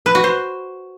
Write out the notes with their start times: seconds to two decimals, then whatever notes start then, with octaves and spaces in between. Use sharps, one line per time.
0.06 B4
0.15 F#4
0.24 C5